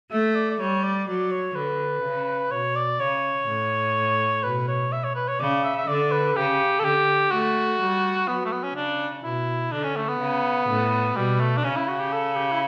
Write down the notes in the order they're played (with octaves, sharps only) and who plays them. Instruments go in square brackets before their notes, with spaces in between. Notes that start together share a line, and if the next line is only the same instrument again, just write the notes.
[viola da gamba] A3 [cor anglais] E5
[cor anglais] D5
D5
[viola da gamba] G3 [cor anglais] C#5
[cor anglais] D5
[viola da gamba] F#3 [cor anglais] D5
[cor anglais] C#5
[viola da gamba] D3 [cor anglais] B4
[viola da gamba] C#3
[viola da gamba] B2 [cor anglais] C#5
[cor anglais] D5
[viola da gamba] C#3 [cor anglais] C#5
[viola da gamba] A2
[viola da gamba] B2 [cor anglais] B4
[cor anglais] C#5
E5
C#5
B4
C#5
[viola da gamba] C#3 [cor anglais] D5
[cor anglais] E5
E5
[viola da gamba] D3 [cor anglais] D5
[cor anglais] B4
[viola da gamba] C#3 [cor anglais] G4
[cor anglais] A4
[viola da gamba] D3 [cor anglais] G4
[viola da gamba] A3 [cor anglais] F#4
[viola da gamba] G3
[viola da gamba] F#3 [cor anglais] B3
[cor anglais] A3
B3
C#4
[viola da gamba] C#3 [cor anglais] D4
[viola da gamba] B2 [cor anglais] E4
[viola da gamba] D3 [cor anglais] D4
[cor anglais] C#4
A3
B3
[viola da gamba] C#3
A2
[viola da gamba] B2 [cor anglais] G3
[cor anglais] A3
D4
[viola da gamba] C#3 [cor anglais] C#4
[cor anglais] E4
F#4
G4
A4
G4
E4